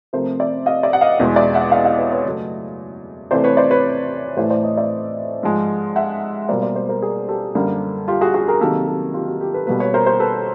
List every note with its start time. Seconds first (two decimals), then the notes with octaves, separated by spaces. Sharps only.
0.13 C3 F3 A3 A#4 C5
0.39 D5 E5
0.66 D#5 F5
0.83 D5 E5
0.93 F#5
1.01 D#5 F5
1.20 E2 B2 G#3
1.36 D5 E5
1.54 E5 F#5
1.72 D#5 F5
1.85 D#5 F5
1.98 B4 C#5
2.12 B4 C#5
2.26 F#2 C#3 F#3 A3
3.31 C3 E3 A3 C5 D5
3.44 B4 C#5
3.57 C5 D5
3.71 B4 C#5
4.37 A2 E3 A3 C5 D5
4.50 C5 D5
4.63 C#5 D#5
4.77 D5 E5
5.43 G#2 F3 G#3
5.96 E5 F#5
6.49 B2 G3 A#3 C5 D5
6.62 C5 D5
6.76 C5 D5
6.89 A#4 C5
7.02 G#4 A#4
7.29 G4 A4
7.55 F#2 D3 G3 A#3
8.08 F4 G4
8.21 F#4 G#4
8.34 F#4 G#4
8.48 G#4 A#4
8.61 C3 D#3 F#3 A#3 G4 A4
8.87 G4 A4
9.14 F4 G4
9.28 F#4
9.41 F4 G4
9.54 A4 B4
9.67 B2 G3 A#3 A4 B4
9.80 B4 C#5
9.94 A#4 C5
10.06 A#4 C5
10.20 A4 B4